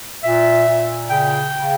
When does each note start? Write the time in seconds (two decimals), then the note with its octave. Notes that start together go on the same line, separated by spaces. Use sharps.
0.23 A#2 E5
0.67 A#2
1.10 C#3 G5
1.54 C#3